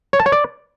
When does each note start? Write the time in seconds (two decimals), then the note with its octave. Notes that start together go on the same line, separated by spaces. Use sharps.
0.13 C#5
0.20 A5
0.26 C#5
0.32 D5